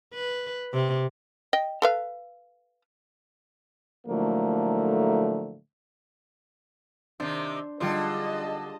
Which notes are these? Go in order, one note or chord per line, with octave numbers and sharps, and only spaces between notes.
B4
C3
D#5 G5
A4 B4 F5
A2 D3 F3 F#3 A3 A#3
C3 D#3 D4 C5
D3 G3 D#4 F4 G#4 C5 D#5 A5